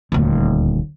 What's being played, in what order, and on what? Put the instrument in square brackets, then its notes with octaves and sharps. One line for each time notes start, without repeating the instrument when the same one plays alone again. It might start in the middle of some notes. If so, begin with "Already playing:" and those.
[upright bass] D#1 D2